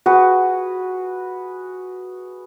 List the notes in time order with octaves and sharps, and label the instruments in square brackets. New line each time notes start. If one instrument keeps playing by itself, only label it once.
[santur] F#4 G#4 B4